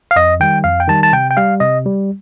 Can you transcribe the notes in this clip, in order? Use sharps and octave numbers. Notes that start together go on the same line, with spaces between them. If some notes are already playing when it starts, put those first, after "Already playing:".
F5
F2 D#5
D#3 G3 G5
F2 F5
G5
D#3 G3 A5
A5
C3 G5
G5
G3 F5
C3 D#5
G3